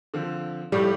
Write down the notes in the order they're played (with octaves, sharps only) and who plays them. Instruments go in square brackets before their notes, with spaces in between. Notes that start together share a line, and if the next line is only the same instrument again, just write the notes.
[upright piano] D3 F3 C4
[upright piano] A2 F3 A3 E4 G4 [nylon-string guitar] G3